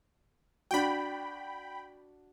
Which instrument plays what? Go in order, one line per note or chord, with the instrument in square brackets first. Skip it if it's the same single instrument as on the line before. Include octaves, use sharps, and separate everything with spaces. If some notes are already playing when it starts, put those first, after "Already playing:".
[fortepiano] D4 F#4 [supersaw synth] G5 B5